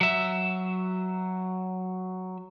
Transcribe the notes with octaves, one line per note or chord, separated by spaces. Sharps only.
F#3 E5